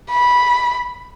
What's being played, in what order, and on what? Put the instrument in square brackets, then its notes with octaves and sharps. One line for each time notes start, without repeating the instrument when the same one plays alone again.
[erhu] B5